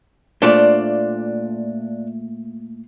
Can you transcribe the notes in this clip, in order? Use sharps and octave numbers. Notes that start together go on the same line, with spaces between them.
A#2 A3 D4 F4 C5 D5